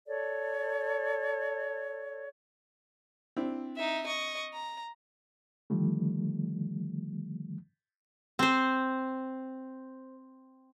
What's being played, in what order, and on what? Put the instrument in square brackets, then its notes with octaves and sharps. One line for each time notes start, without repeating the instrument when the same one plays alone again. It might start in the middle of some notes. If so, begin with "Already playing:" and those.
[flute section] A4 C#5 D5
[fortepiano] C4 D4 E4
[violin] D#4 E5
D#5 C#6
A#5
[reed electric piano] D3 D#3 F3 G3 A3
[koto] C4 C5